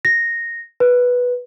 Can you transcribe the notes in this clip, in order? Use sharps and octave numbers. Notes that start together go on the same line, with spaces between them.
A#6
B4